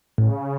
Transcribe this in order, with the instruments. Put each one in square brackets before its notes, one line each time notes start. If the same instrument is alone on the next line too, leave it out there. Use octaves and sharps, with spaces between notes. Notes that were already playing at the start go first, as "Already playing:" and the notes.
[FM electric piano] A2 [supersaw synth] C#3